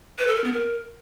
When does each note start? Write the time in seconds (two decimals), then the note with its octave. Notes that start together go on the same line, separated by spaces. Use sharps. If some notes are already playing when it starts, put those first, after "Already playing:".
0.19 B4
0.27 A4
0.36 A#4
0.44 B3
0.53 A#4